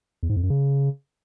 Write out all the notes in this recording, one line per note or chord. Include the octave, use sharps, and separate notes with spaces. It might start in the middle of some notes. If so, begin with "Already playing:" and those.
E2
G#2
F2
F#2
C#3